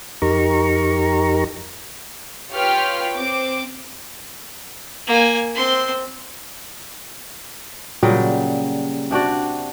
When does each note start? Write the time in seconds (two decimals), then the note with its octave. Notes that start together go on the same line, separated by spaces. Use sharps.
0.22 F2 D#4 G4 A#4 A#5 C#6
2.52 F4 G4 B4 C#5 G5 F6
3.15 C4 D6
5.07 A#3 G#5
5.55 C4 C6
8.03 A#2 C#3 F#3 G3
9.11 C3 D4 F#4 D5